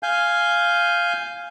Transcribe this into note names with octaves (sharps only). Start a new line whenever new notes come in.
F5 G#5 G6